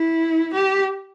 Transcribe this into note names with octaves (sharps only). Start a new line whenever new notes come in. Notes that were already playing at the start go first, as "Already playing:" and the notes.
Already playing: E4
G4